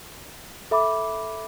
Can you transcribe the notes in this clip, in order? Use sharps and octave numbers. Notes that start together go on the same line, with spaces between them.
A4 E5 B5 D6